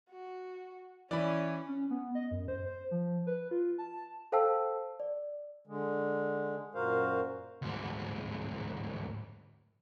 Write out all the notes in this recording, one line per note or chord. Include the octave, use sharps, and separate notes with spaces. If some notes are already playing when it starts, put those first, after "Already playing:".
F#4
E3 C#4 E4 D5 B5
C#4
B3
D#5
F#2
C5
C5
F3
B4
F4
A5
A4 C5 F5 G5 A5 E6
D5
D3 G#3
F#2 A#2 F#4 A#4 C5 F5
D2 G#2